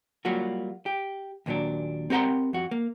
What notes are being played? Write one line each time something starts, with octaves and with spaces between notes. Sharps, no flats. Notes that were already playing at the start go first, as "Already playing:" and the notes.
F#3 G3 A#3 F4 F#4
G4
D#2 A#2 D#3 F#3 D4
C4 G4 A#4 F#5 A#5 C6
F2 F#4
A#3